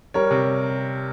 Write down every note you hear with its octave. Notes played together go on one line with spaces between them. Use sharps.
G3 A#4 C#5
C3